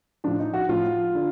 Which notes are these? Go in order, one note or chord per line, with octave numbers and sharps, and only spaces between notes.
A2 F3 D4
D#4
F#4
A2 F3 F4
D3